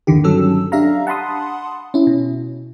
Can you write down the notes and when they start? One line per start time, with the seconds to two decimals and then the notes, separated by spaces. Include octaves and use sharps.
0.07 G1 D#2 D3 D#3 G4
0.24 G2 F#3 C#4 A4 E6
0.72 D4 G4 E5 F5 A#5
1.07 F#5 A5 B5 C6 D#6
1.94 C#4 E4
2.07 B2